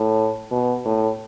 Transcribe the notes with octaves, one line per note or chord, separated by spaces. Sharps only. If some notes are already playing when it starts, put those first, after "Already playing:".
Already playing: A2
B2
A2